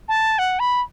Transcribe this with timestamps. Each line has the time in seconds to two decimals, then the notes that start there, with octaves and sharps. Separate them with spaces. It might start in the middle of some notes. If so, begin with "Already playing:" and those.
0.08 A5
0.38 F#5
0.59 B5